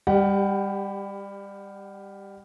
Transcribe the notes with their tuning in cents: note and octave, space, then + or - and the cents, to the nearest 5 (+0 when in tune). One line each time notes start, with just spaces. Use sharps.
G3 +25 G4 +0 F#5 +25